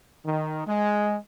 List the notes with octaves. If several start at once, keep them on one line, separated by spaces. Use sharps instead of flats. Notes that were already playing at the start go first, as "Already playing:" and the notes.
D#3
G#3